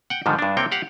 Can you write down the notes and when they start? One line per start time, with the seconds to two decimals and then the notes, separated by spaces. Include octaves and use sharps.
0.10 F#5 G5
0.26 G#2 D3 D#3 F3 G3
0.39 G2 D4
0.57 C3 A#3 C4 C#5 G5
0.72 G4 F5 F#5